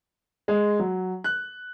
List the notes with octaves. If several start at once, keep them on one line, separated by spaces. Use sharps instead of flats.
G#3
F#3
F#6